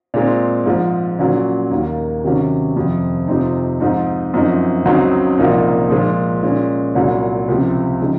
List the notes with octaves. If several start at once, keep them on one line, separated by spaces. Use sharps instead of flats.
A#2 G#3 C4
G#2 F3 G#3
A#2 F#3 C#4
D#2 D#3 A#3
C3 D#3 F#3 C#4
F2 C3 F3
F2 C3 F3 C4 D#4
G#2 F3 C4 D#4
F#2 F3 C4 D#4
C#2 C#3 F#3 C4 D#4
C2 A#2 F3 A#3 D#4
A#2 F3 G#3
A#2 G#3 C#4
C2 A#2 F#3
C#2 C3 F3 C4
C#3 F3 G#3 D#4